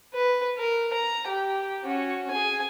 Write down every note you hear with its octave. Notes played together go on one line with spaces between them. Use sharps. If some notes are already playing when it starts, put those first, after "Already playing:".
B4
A#4
A#5
G4
C#4 F#4
G#4 G#5